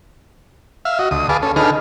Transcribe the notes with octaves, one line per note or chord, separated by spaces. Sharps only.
E5 F5
F#4 D#5
D2 D#6
G#4 B4 F5 A5 D6
C#4 A4
D3 D#4 G#4 A4 B4 F6